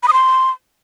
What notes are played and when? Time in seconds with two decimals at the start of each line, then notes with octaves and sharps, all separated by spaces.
0.03 B5
0.08 D#6
0.13 C6